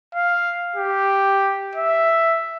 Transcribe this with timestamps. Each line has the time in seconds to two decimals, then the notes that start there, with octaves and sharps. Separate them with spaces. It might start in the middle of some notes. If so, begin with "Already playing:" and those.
0.15 F5
0.76 G4
1.75 E5